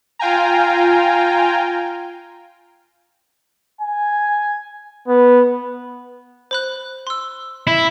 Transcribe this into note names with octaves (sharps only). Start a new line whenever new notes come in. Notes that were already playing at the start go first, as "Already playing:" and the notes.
F4 F5 G5 G#5 A#5
G#5
B3
C5 B5 F#6
C6 E6
E4